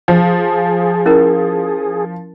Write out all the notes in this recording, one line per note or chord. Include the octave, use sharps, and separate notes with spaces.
F3 G#4
C#4 E4 A#4